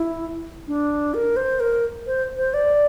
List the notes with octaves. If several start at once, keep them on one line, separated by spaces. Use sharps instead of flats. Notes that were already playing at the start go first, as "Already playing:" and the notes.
Already playing: E4
D4
A#4
C5
A#4
C5
C5
D5